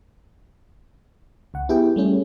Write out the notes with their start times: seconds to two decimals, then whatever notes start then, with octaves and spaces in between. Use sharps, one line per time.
1.54 C#2 F#5
1.69 B3 E4 G4 G#4 G5
1.96 G3 A3 C#4 G#4